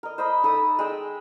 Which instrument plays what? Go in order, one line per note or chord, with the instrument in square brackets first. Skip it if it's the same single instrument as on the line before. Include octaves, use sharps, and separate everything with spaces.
[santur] A#4 D#5
C5 D#5 B5
D#4 A4 B5 D#6
G#3 G5 E6